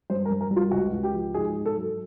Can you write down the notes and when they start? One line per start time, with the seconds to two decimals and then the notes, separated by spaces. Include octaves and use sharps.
0.10 G2 C5
0.25 A#4
0.31 G2
0.41 A#4
0.51 G3
0.56 F4
0.71 C#2 F#4
0.92 C#2
1.03 G4
1.14 F3
1.34 G#2 G#4
1.56 G#2
1.66 A4
1.77 F#3